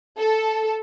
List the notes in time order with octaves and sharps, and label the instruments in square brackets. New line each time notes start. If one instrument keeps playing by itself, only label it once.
[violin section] A4